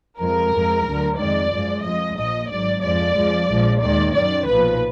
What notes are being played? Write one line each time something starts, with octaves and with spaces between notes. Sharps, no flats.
F2 F3 G#3 A#4
F2 F3 G#3
D2 D3 F#3
F2 D#3 G#3 D5
F#2 F3 G#3
F2 F3 G#3 D#5
A#1 A#2 F3 D#5
G#1 G#2 F#3 D5
F2 F3 G#3 D5
F2 F3 G#3
A#1 A#2 F3 G#3
D#2 D#3 G#3 D5
F#2 D#3 F#3 D5
B1 A#2 F3 B4